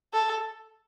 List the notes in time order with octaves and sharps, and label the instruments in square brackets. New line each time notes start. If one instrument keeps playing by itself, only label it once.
[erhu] A4